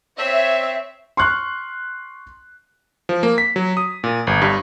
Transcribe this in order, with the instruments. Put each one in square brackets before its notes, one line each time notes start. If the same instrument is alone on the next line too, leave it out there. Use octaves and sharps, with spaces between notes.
[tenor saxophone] C4 [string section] C#5 E5
[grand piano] C6 C#6 F6 F#6
[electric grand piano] F3
A#3
B6
F#3
D#6
A#2
G1
G2